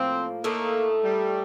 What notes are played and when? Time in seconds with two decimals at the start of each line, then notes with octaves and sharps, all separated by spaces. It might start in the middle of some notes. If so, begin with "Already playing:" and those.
Already playing: A2 F3 A#3 C4
0.44 A2 A3 A#3 D#4
1.04 G3